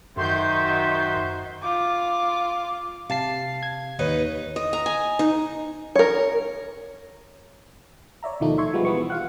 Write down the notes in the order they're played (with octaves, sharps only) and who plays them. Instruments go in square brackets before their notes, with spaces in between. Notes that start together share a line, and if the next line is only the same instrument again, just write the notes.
[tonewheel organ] F#2 [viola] D#3 [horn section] F#4 C5 E5 [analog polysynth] C6 G6
[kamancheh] F4 D6
[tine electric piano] C3 A5 C7 [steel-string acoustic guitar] F5
[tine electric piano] G#6
[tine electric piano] D#2 [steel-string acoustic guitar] D#4 B4 C#5
[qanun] D#5
A#5
G#5
D#4
[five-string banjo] A#4 C#5
[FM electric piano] C#5 D5 E5 A#5
D#2 B2 D#3 F3 A3 D#4
E5 C6 C#6 G#6
F3 G3 G#3 B3
E3 B3 C#6
F4 F5 F#5